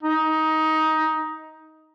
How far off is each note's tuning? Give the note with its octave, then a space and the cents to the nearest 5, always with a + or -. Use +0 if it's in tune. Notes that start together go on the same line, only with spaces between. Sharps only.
D#4 +15